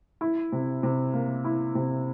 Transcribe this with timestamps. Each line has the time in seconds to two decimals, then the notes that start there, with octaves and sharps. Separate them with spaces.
0.21 E4
0.52 C3
0.83 C3
1.14 A#3
1.44 E4
1.75 C3